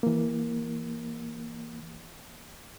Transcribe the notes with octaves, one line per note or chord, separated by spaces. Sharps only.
E3 A#3